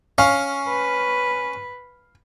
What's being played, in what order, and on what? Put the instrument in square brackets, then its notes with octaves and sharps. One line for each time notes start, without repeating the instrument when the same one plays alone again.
[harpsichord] C#4 [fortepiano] F5
[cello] B4